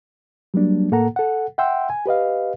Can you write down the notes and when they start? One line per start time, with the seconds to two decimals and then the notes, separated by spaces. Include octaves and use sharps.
0.54 F#3 G3 A#3 D4
0.91 A2 A#3 A4 F#5 A#5
1.16 A4 F#5
1.58 E5 F#5 G5 C6 E6
1.90 G#5
2.06 G4 B4 D#5 F5